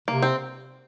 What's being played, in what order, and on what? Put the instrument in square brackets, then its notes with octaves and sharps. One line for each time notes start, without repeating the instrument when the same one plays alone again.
[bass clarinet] C3 [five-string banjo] A#3
[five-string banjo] C4